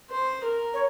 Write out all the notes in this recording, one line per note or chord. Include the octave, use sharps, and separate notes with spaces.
C5
A#4
C#5